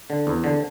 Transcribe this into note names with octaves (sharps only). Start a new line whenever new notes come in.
D3
E2
D3